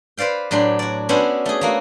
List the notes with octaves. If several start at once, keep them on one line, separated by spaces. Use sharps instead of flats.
B4 C5 D5 F5 G5
A2 F#3 D4 G4 C6
F#4 D5
B3 C#4 D4 E4 F#4 C5
A3 G#4
A3 A#3 F#4